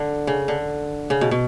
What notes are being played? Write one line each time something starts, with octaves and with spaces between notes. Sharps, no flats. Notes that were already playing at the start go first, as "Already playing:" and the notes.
Already playing: D3
C#3
D3
C#3
B2
B2